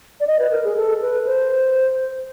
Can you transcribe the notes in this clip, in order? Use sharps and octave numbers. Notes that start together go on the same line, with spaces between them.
D5
D#5
B4
A#4
G#4
A4
B4
C5